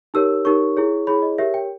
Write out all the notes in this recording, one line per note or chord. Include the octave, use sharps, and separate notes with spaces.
D#4 G4 A#4 C#5 E6
D#4 G4 A#4 C#5 C#6
E4 G#4 C#5
E4 G#4 C#5 B5
D#5
G4 A#4 C#5 E5
G5